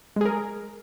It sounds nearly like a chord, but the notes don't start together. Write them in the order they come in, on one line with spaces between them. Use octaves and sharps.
G#3 G#4 A#4